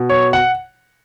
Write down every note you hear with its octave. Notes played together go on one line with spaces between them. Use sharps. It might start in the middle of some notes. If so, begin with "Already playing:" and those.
Already playing: B2
C#5
F#5